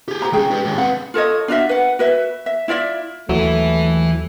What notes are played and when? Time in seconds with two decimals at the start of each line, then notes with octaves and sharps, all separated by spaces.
0.08 G4 G#4
0.22 F#4 C5 A#5
0.33 G#3 C#4 G#4 G5
0.51 G4 B4
0.65 D#2 G#2
0.78 C4 B4 F#5
1.14 F4 A4 C#5 D#5
1.48 D4 F4 F#4 E5
1.69 B4 F#5
1.99 F#4 B4 E5
2.46 E5
2.68 E4 F4 D5 E5
3.29 D#2 E3 F#3 A3 E4